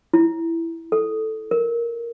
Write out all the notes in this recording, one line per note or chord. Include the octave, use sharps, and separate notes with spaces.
E4
A4
A#4